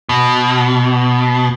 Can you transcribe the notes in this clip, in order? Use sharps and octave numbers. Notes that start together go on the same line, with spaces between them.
B2